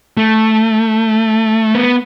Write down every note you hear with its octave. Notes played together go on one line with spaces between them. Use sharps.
A3
B3